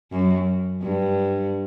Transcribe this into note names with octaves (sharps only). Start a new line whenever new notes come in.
F#2
G2